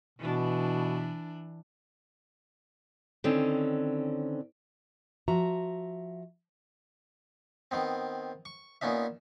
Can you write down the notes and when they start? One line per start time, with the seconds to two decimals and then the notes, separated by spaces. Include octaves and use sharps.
0.19 B2 E3 D4
3.24 D3 D#3 C4 C#4
5.28 F3 F#4 E5 A#5
7.71 D#3 B3 C4
8.45 C#6
8.81 A#2 B3 C#4 D#4 E5